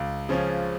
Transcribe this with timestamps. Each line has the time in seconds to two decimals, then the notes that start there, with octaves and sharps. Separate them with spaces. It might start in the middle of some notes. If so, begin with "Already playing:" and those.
Already playing: C#2
0.29 C#3 F3 C#4